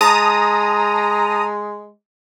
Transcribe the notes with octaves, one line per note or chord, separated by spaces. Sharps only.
G#3 A5 A#5 D#6